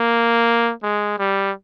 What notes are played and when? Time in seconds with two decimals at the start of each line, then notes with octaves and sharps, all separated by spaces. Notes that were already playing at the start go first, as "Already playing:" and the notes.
Already playing: A#3
0.83 G#3
1.19 G3